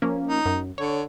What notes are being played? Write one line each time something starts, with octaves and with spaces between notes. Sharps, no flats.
F3 A#3 C#4
D#4
F#2
D3 C#5